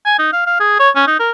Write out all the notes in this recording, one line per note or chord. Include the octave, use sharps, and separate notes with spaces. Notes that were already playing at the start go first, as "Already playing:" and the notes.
G#5
D#4
F5
F5
G#4
C#5
C#4
D#4
A#4